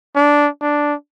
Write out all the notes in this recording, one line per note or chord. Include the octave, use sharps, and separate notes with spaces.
D4
D4